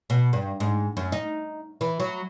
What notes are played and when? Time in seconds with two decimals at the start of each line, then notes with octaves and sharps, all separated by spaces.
0.10 B2
0.33 G2
0.60 G#2
0.97 F#2
1.12 D#4
1.81 E3
2.00 F#3